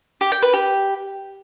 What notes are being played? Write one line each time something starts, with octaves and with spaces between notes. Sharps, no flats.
G4
G5
B4
G4